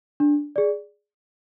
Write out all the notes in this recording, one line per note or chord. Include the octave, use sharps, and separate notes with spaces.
D4
G#4 D5